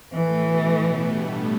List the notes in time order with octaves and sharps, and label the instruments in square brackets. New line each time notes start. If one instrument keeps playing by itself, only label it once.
[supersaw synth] A2 A3 [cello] E3
[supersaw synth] B2 B3
A2 A3
G2 G3